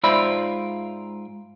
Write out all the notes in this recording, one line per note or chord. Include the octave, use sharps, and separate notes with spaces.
G#2 F4 C5 D5 E5 B5